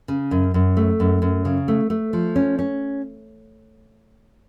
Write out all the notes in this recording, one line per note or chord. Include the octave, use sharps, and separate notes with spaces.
C#3
F#2
F#2
A3
F#2
F#2
C#3
A3
A3
F3
C#4
C#4